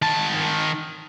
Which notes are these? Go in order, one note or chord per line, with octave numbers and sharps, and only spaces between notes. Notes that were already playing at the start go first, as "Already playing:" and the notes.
D#3 A5